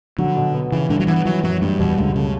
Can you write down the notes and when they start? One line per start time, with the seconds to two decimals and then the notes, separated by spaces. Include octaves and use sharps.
0.18 D3 F#3
0.36 B2
0.54 B3
0.72 C#3 E3
0.90 G2 D3
1.00 F#3
1.08 E3 B3
1.25 E3 F#3
1.43 F#2 F#3
1.62 G2 G3
1.79 E2 B2
1.98 C#2 D3
2.15 C#3 A3